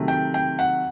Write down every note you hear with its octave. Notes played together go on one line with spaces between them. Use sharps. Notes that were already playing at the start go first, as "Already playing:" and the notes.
Already playing: C3 D#3 F#3 A3
G5
G5
F#5